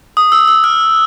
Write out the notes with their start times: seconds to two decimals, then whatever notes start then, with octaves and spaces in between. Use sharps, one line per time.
0.17 D#6
0.32 E6
0.48 E6
0.64 F6